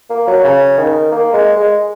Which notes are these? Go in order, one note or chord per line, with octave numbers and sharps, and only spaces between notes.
A#3
F#3
C#3
D#3
A#3
G#3
G#3